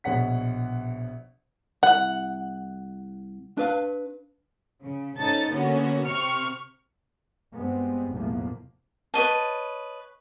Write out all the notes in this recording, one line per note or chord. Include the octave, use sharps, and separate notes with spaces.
A#1 B2 C#5 F#5 B6
C2 F#5
D4 B4 F5
C#3
G#2 C#4 D#4 A4 A6
D3 A#3 B3 C#4 F#4
C3 C4 C#6 F6 C#7
G2 G#3 B3 C4
F1 B1 E2 A2 F3 A#3
B4 C#5 D#5 A5